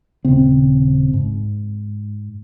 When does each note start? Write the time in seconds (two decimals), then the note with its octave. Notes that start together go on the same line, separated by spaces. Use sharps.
0.25 D#1 C#3 C4
1.13 G#2